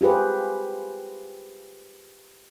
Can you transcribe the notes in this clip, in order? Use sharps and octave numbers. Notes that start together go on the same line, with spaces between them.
F4 G4 G#4 B4 C5